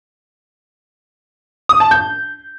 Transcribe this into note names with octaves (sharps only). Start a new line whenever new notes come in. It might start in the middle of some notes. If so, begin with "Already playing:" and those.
D#6
A5
G6